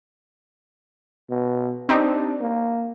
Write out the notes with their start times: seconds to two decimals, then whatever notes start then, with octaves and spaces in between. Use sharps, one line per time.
1.30 B2
1.89 C4 D4 D#4 G4
2.41 A#3